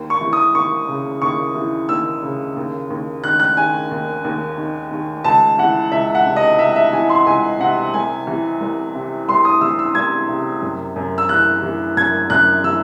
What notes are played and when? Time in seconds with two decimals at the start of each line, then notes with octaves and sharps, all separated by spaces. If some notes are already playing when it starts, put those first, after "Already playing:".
Already playing: D#2
0.10 C#6
0.21 E3
0.33 D#6
0.55 D#2 C#6
0.88 C#3
1.22 D#2 C#6
1.56 E3
1.89 D#2 E6
2.23 C#3
2.57 D#2
2.90 D#2
3.24 D#3 F#6
3.40 F#6
3.57 D#3 G#5
3.91 D#2
4.24 D#2
4.58 D#3
4.91 D#3
5.24 C#2 A5
5.58 E3 F#5
5.92 C#2 E5
6.15 F#5
6.26 C3
6.36 D#5
6.59 C#2 E5
6.76 E5
6.93 E3 G#5
7.09 C6
7.26 C#2 G#5
7.60 C3 F#5
7.94 C2 G#5
8.27 E3
8.61 C2
8.95 C3
9.28 C2 C6
9.45 D#6
9.61 E3 E6
9.79 E6
9.95 C2 G#6
10.29 C3
10.63 F#2
10.96 F#2
11.18 E6
11.29 E3 F#6
11.62 E3
11.97 F#2 G#6
12.30 F#2 F#6
12.64 E3 E6